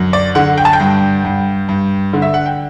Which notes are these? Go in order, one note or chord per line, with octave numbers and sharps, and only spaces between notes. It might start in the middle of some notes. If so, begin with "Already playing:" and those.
Already playing: F#2 D3
D5
D3 F#5
G5
A5
G5
G2
G2
G2
D3
E5
F#5
G5